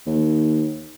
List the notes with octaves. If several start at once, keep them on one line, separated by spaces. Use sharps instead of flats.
D#2